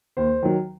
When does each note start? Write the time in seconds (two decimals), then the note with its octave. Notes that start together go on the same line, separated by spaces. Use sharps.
0.17 D#2 C5
0.43 D#3 F#3